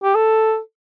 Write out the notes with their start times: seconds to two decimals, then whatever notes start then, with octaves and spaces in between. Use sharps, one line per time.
0.04 G4
0.15 A4